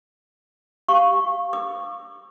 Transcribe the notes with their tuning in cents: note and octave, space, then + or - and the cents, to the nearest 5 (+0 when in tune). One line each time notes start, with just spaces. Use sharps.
G4 -10 F5 +0 C#6 -10
B4 -30 D6 +35